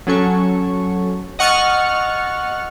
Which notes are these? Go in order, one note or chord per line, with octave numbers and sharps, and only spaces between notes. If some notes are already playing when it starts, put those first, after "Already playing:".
F#3 C#4 A4 C#6
D#5 F#5 C#6 F6 A6 C#7